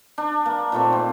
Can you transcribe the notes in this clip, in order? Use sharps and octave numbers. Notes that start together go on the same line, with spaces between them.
D4
A#3
A#2 D#3 A3 C4
C4